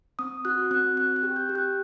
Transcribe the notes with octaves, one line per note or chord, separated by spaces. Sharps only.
C4 D#6
F#4 F#6
C4 F#6
C4 F#6
F#6
G4
G6
G4
F#6